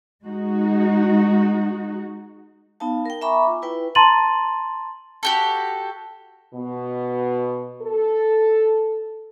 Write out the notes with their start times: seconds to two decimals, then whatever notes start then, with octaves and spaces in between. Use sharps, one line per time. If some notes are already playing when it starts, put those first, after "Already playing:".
0.24 G#3 D#4 F#4
2.80 B3 D#4 F5 A5
3.06 A#4 G5
3.21 E5 G#5 A#5 B5 C#6 D6
3.43 F4 D6
3.62 E4 B4 G5
3.95 A5 A#5 C6 A6 D#7 F#7
5.23 F#4 G4 A4
6.54 B2
7.82 A4